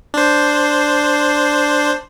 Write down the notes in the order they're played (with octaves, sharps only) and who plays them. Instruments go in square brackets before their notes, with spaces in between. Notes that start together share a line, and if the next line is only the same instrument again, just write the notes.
[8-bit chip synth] D4 C5